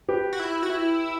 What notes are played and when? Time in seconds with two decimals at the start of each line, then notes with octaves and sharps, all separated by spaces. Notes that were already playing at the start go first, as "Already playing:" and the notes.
0.08 G4 B4
0.33 F#4
0.39 E4
0.63 F#4
0.70 E4